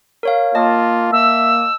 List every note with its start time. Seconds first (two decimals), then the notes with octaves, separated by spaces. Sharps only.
0.23 A#4 C#5 F5
0.55 A#3 F4 D#5 A5
1.12 A#3 E5 E6